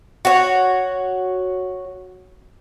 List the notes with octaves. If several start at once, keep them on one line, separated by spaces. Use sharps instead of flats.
F#4 C#5